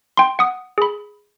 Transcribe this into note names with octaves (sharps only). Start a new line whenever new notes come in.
G5 C6
F#5 D#6
G#4 B5